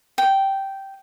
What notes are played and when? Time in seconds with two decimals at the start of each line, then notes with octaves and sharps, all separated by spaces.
0.18 G5